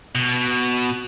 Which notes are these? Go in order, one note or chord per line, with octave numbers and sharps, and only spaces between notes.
B2